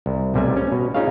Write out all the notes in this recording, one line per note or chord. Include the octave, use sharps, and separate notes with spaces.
C2
B1 C3 G3 A3 G#5
C#4
B2
C#4 D#4 F4 G#4 C#5 F5